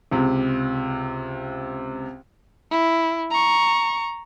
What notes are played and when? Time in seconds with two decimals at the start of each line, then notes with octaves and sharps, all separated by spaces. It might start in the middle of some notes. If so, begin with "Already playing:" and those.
0.11 C#2 C3
2.71 E4
3.31 A#5 C#6